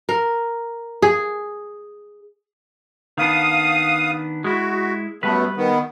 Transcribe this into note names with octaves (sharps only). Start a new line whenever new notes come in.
A#4
G#4
D#3 B3 D4 F5 D#6
G#3 E4 F#4
F#2 G3 A3 B3 B4
D#3 B3